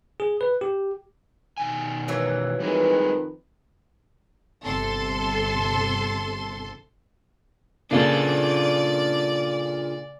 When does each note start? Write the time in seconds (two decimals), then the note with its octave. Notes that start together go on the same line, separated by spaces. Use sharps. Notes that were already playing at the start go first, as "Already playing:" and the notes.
0.20 G#4
0.41 B4
0.61 G4
1.58 B2 D#3 G#5
2.08 E3 F#3 A#3
2.60 F2 D#3 G3 G#3 G#4 B4
4.65 G1 C3 A4 C6
7.91 A#2 C#3 A#3 D4 F4 A4 D5